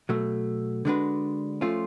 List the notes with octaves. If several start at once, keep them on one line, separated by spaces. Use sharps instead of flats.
B2 F#3 A3
D3 G#3 D4 F#4 B4
F3 A3 C#4 F4